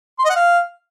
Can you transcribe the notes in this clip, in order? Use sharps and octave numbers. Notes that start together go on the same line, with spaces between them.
C6
D#5
F#5
F5